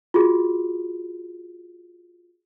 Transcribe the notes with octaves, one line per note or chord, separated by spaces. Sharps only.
F4 F#4 G#4